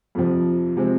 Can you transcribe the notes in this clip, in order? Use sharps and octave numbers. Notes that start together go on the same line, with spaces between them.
F2 C3 F3
C3 F3 G#3 C4